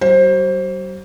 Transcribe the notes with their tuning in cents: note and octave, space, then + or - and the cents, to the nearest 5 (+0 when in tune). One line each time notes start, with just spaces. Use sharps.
F#3 +45 C5 +20